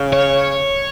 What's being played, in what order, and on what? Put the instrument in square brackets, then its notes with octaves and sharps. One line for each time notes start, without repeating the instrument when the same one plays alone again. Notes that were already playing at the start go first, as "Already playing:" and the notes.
Already playing: [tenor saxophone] C#3
[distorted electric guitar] C#5